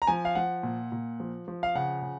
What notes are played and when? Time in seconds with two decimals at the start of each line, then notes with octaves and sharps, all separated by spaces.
0.02 A#5
0.07 F3 G#5
0.25 F5
0.35 F3 F#5
0.63 A#2
0.92 A#2
1.20 F3
1.48 F3
1.63 F5
1.75 C#3 F#5
2.02 C#3